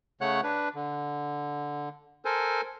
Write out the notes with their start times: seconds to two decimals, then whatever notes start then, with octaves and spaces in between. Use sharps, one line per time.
0.21 C#3 A3 C#5 F#5 F#6
0.43 D4 B4
0.75 D3
2.25 A4 A#4 C5 G#5